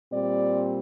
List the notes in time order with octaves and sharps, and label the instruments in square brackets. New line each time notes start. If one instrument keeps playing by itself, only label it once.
[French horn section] A#2 G3 C4 D5